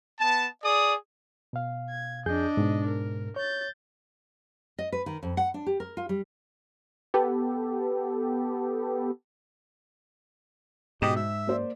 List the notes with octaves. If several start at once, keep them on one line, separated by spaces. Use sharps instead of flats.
B3 A5
G#4 D5 D#6
B2 F5
G#6
F2 D4 G#4 D#5 G6
G#2 B2
A#4
C#5 G6 A6
D#5
B4
D#3
F2
F#5
D4
G4
A#4
F4
G3
B3 G4 A4
G#2 B2 G4 D#5 B6 E7
G#3 E5
A#3 C5 D5